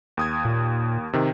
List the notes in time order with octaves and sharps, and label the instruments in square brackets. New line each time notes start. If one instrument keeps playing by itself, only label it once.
[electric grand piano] D#2 D#6 G#6
[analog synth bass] A#2
[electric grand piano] C3 D#3